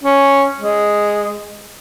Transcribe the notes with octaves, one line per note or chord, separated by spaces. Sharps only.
C#4
G#3